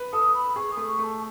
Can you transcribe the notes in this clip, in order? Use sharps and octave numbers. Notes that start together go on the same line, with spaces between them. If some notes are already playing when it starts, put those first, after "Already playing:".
Already playing: B4
A4 D#6
B5
G#4 C#6
D#6
A3
C#6
A3
A5